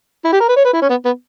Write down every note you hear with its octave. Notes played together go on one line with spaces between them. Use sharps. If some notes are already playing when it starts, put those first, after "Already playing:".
E4
G4
A#4
B4
C#5
B4
E4
C#4
B3
B3